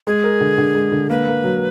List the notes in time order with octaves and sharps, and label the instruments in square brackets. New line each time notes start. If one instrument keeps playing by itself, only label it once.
[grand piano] G#3 [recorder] G#4
[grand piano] A#4
D3
D3
G#3
D3
[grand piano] A#3 [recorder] B4
[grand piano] A#3
F#3